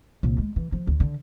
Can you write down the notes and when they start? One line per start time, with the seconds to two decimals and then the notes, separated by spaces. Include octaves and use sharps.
0.23 C2 A#2
0.38 G#3
0.56 E3
0.72 F3
0.87 D2
1.00 D3